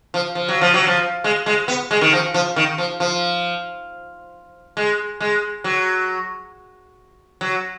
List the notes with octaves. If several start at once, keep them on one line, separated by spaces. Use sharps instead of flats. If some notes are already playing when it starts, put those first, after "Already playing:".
F3
F3
F#3
F3
F#3
F3
G#3
G#3
B3
G#3
D#3
F3
F3
D#3
F3
F3
G#3
G#3
F#3
F#3